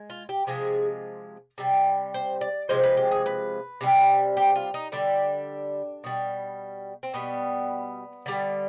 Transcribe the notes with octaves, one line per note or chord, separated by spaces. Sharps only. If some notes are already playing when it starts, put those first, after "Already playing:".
Already playing: G#3
F4
G4
C3 F3 G#3 G#4
C3 G3
C5
D5
C3 F3 G#3 C5
B4
G4
G#4
B4
C3 G3
G4
F4
D#4
D3 G3 D4
B2 G3
C4
B2 G3 B3
D3 G3